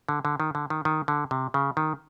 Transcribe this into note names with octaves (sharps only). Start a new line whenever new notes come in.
D3
D3
D#3
D3
D#3
D#3
D3
C3
C#3
D#3